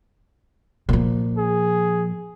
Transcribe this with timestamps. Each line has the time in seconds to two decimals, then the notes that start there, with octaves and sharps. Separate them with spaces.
0.89 A#2 F3
1.37 G#4